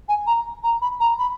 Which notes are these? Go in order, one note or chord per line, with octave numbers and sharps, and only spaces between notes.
G#5
A#5
A#5
B5
A#5
B5